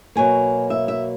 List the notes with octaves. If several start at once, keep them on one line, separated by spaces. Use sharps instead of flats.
B2 F#3 A#3 G#5
E5
E5